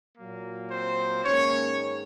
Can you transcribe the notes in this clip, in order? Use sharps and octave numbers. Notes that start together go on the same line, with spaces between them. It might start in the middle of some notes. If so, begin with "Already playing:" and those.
A#2 F#3 A#3
C4 C5
G#2 D#3 A#3 C#4 C#5